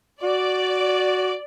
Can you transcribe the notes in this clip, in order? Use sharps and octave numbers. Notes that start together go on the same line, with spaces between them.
F#4 D5